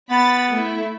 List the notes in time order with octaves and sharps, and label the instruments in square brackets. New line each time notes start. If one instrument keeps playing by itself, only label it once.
[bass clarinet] B3 [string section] B5 A6
[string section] A3 E4